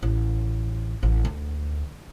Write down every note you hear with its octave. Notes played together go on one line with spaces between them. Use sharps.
A1
A1
D2